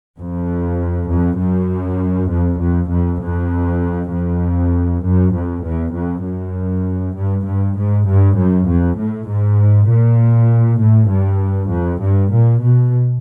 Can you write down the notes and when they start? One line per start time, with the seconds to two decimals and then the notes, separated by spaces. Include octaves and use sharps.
0.18 F2
1.09 F2
1.40 F#2
2.31 F2
2.60 F2
2.91 F2
3.22 F2
4.12 F2
5.04 F#2
5.34 F2
5.65 E2
5.94 F2
6.24 F#2
7.16 G2
7.46 G2
7.77 G#2
8.07 G2
8.37 F#2
8.67 F2
8.97 A2
9.28 G#2
9.88 A#2
10.80 A2
11.10 G2
11.70 F2
12.02 G2
12.32 A#2
12.62 B2